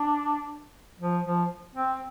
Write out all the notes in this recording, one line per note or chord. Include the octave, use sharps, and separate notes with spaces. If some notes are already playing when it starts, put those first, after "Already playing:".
Already playing: D4
F3
F3
C4